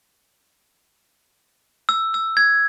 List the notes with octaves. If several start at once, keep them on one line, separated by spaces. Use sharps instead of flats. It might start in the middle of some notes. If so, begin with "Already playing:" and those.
E6
E6
G#6